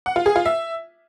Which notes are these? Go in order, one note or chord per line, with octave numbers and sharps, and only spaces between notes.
F#5
F4
G#4
F4
E5